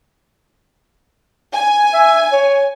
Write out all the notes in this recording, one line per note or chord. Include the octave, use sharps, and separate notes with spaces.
G#5
E5
C#5